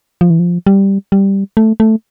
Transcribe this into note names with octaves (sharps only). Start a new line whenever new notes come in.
F3
E3
F3
G3
G3
A3
A3